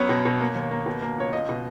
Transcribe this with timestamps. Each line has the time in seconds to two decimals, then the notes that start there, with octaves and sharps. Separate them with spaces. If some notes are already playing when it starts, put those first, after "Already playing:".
Already playing: F#2 B3 C#5
0.09 B2
0.25 B2
0.40 A#3
0.55 D#2
0.71 A#3
0.86 B2
1.02 A#3
1.18 C#2 C#5
1.33 C#2 D#5
1.49 B2